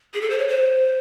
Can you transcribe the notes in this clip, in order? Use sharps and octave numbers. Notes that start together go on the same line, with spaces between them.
G#4
A4
C5
C#5
C5